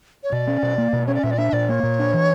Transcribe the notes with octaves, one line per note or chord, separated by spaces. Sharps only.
C#5
B2 D5
C#4
B2
A#3
B2
C#4 C#5
D5
A#2 E5
D5
D4 E5
A#2 D5
A#3 C#5
A#2
D4
E3